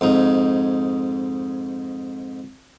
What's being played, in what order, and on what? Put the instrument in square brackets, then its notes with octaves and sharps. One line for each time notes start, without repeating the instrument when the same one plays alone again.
[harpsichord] F2 G#2 D#4